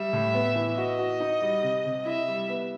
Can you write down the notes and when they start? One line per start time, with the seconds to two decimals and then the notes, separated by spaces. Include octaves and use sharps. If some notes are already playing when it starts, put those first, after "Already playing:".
Already playing: G3 E5
0.13 A2
0.34 B3
0.56 E3
0.77 F#4 D#5
0.99 F#4
1.20 D#4
1.42 G3
1.63 C3
1.85 C3
2.06 E4 E5
2.28 G3
2.49 B3